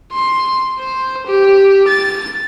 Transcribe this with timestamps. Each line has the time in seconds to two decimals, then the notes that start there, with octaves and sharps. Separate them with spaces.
0.12 C6
0.78 C5
1.27 G4
1.88 A6